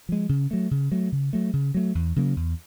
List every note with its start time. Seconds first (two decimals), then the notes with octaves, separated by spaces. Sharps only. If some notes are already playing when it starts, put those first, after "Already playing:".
0.09 F3 G#3
0.29 C#3
0.51 F#3 A3
0.71 C#3
0.91 F#3 A3
1.12 C#3
1.33 F#3 A3
1.53 C#3
1.74 F#3 A3
1.95 E2
2.16 C#3 F#3 A#3
2.36 E2